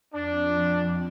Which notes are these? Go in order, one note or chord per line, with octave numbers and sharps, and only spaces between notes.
F2 D4